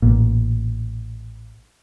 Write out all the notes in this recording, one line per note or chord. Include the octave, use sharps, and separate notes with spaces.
A1 A#2